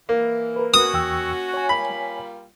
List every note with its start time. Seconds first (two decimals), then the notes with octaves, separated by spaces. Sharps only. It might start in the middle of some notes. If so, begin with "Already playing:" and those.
0.09 E3 A#3
0.56 A#4 B4
0.74 C#4 F#4 D#6
0.94 E2 G5 E6
1.54 C#5 G#5
1.69 G3 A#3 F4 B5